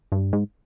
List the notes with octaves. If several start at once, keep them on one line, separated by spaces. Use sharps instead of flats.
G2
G#2